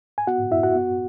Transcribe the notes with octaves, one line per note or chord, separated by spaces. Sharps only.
G#5
B3 F#4 F#5
F#2 E4 E5
F#4 F#5
B3